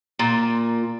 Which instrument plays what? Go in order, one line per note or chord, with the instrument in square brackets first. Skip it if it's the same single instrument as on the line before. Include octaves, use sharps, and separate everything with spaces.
[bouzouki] A#2